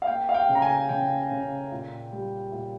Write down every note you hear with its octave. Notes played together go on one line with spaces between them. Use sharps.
F5
A#3 G5
F5
G5
C#3
A#5
G#5
C#3 G5
C#3
A#2
G3
A#2